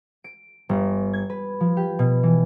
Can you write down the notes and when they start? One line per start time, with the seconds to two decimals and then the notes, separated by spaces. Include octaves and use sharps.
0.24 D7
0.69 G1
1.13 G#6
1.30 B4
1.60 F3
1.77 G4
1.99 B2
2.23 E3